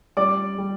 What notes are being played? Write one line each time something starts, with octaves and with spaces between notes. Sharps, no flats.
G3 D5 D6
G3